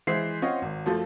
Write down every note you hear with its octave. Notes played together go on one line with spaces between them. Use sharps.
E3 G#3 C5 E5 C7
C4 C#4 F4 C#5 D#5 F#5
G#1
F#2 F3 A3